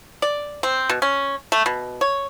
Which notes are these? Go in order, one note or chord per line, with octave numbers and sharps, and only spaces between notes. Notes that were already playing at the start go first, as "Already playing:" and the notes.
D5
C4
B2
C#4
A3
B2
C#5